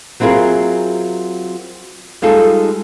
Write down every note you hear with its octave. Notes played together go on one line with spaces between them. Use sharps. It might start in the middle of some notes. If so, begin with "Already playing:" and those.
F#3 C4 E4 F4 G#4 A#4
G3 G#3 D#4 F4 A4